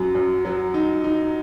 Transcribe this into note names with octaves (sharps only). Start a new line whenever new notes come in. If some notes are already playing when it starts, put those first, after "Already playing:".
Already playing: F#2 F#3
F#2
F#3
D#4
D#4